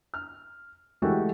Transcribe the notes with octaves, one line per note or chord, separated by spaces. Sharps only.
F6
E3 G#3 A3 F#4 G4 A4